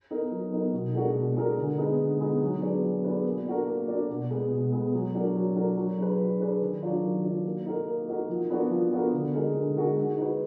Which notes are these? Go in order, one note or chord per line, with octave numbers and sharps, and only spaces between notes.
B3 D#4 A#4
F#3
B3 D#4 A#4
B2
G#3 D4 F#4 A#4
B2
G#3 D4 F#4 A#4
D3
G#3 B3 D#4
D3
G#3 B3 D#4
F#3
B3 D4 G#4 B4
F#3
B3 D4 G#4 B4
A#3
D4 F#4 A#4
A#3
D4 F#4 A#4
B2
G#3 B3
B2
G#3 B3
F#3
D4 F#4 A#4
F#3
D4 F#4 A#4
F#3
D4 G#4 B4
F#3
D4 G#4 B4
D#3
F#3 D4 F4
D#3
F#3 D4 F4
A#3
D#4 F#4 A#4
A#3
D#4 F#4 A#4
F3
B3 D4 F#4 A#4
F3
B3 D4 F#4 A#4
D3
G#3 D#4 F#4 A#4
D3
G#3 D#4 F#4 A#4
G#3
D#4 F#4 B4